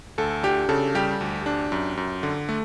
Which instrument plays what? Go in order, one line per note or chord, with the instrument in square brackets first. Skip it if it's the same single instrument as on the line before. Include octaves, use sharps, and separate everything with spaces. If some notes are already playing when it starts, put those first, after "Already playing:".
[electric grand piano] D2 [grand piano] A4
[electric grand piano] D4 [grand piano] G4
[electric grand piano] C#3 [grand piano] A4
[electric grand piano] G3 [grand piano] G4
[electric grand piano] D2
D4
F#2
F#2
D3
A3